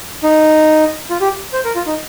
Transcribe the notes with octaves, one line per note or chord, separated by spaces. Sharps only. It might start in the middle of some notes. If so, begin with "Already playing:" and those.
D#4
F4
G4
C5
A#4
F4
D#4